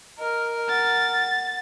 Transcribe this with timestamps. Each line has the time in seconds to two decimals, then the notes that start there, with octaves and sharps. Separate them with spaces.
0.19 A#4 D#5
0.69 F#5 A6